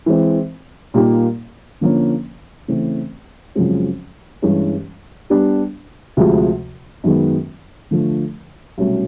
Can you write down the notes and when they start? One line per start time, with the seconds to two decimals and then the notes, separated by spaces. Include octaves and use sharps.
0.06 E3 G#3 C4
0.94 A#2 G3 A#3 D#4 G4
1.81 D3 F3 A#3 C#4
2.68 C#3 E3 A3 C4
3.55 F#2 C#3 F3 G#3 C4
4.42 G2 E3 G#3 C#4
5.30 G3 B3 D4
6.17 D2 C3 F3 G#3
7.04 F#2 D#3 G#3 B3
7.91 D3 F3 A3
8.78 C2 B2 F#3 A3 C#4